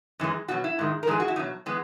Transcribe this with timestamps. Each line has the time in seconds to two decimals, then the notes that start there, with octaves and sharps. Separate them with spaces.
0.20 F#2 E3 G#3
0.48 B2 F#3 F#4
0.64 E4
0.79 G#2 D#3 G#3
1.03 A#4
1.07 G#2 E3 G#3 G#4
1.20 F#4
1.28 E4
1.36 B2 F#3 D#4
1.66 E3 G#3 B3